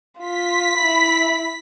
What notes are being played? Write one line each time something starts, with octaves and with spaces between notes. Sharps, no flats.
F4 B6
E4 B5